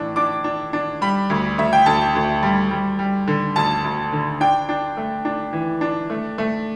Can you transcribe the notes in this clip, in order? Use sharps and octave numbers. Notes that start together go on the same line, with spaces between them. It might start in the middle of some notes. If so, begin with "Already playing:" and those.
Already playing: A2 E3 D4
D4 D6
D4
D4
G3 B5
D2
D2 E5
G5
D2 A5
D2
G3
G3
G3
D3
D2 A5
D2
D3
D4 G5
D4
A3
D4
E3
D4
A3
A3